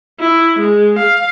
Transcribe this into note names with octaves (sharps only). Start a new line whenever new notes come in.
E4
G#3
F5